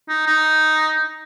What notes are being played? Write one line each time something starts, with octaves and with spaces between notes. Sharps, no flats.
D#4
D#4